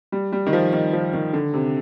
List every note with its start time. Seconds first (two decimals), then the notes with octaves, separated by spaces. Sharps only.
0.12 G3
0.32 G3
0.46 D#3
0.53 F3
0.73 D#3
0.93 F3
1.13 D#3
1.33 D3
1.54 C3